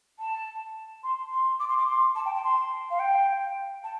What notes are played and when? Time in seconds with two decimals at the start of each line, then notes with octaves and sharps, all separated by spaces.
0.19 A5
1.03 C6
1.31 C6
1.60 D6
1.69 C6
1.78 D6
1.87 C6
2.15 A5
2.25 G5
2.34 A5
2.44 C6
2.90 F5
2.99 G5
3.84 A5